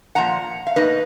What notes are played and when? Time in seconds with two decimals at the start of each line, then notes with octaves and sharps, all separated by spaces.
0.15 A#2 F3 A#3 F#5 A#5
0.67 F5
0.76 B2 A#3 D#4 B4 D#5